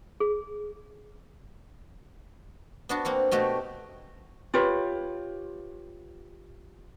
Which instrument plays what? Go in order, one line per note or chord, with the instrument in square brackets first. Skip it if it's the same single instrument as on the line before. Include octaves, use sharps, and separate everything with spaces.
[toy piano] G#4
[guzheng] B3 D4 F#4
A#3 C4 F#5
B2 A3 F#4 G4
[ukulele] F4 G4 B4 C#5